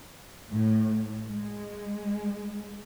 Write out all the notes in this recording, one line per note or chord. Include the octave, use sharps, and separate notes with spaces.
A2
G#3